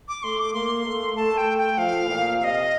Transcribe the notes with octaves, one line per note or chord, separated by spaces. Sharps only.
D6
A3 C6
D6
A#3 C6
A3
A3 A5
G5
G5
F3 F5
A#2
C3 D#5 F5